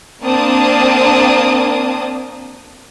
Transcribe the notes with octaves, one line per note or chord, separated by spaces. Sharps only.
A#3 C4 D4 A5 D#6